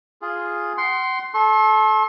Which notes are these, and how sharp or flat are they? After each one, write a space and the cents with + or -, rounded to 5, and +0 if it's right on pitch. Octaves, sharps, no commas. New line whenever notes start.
F4 +0 G#4 +0
F#5 +35 C6 +0
A4 -25 C6 +45